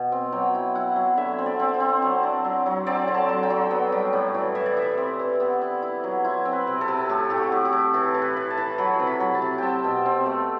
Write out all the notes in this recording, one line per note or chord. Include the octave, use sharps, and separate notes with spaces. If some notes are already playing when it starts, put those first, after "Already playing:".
Already playing: B2
C4
F#3 G5
E4
E4 F#5
F#3
D3 E5
C4
D5
C4
C5
C4
F#3
D4
F#3
F#3
C4 D5
D3
A5
F#3
G5
F#3
B3
G3
A2
E3
E3 E5
D5
E3 E5
C4
E3
B3
E4
E4
F#3
E4 C5
C4
B4
C3
A4
C3
A2 G4
A2 G4
F#4
A2
G4
A2
E3 A4
E3
B4
E3
A5
E3
F#3 B5
C3
B5
F#3
A5
C3
C4 G5 A5
B2
C4
A3